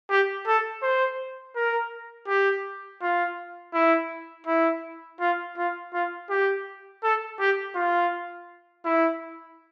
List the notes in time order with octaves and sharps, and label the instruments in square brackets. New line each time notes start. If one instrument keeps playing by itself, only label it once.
[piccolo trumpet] G4
A4
C5
A#4
G4
F4
E4
E4
F4
F4
F4
G4
A4
G4
F4
E4